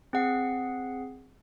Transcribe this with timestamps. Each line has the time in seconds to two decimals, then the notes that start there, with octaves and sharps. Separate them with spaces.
0.13 C4 G#4 F#5 C7